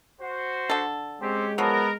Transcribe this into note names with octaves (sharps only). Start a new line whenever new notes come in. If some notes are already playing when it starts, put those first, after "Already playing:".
F#4 C5
D3 A4
G#3 C4 C#4 G4
F3 F#3 B3 A#4